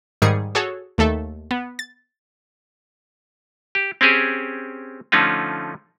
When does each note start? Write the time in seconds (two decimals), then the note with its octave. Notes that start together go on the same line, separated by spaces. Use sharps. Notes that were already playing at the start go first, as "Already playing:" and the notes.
0.22 G#2 D#3 G3 G#4 C#7
0.55 F#4 G#4 A4 C#5
0.98 D#2 A3 A4 E5
1.51 B3
1.79 A6
3.75 G4
4.01 C4 C#4 G4 G#4
5.12 D3 F3 A3 C#4 D#4 F4